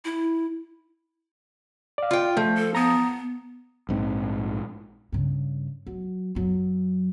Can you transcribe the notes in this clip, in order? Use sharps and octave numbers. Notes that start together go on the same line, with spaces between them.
E4
D5 F5
F4 G5
F3 A3
A4
B3 A#5 D#6
A#1 G#2 C4
G2 C#3
F#3
F#2 F#3